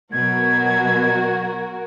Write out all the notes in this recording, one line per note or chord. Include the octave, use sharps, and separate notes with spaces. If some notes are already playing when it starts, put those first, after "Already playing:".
B2 F#3 F#4 A#4 G#6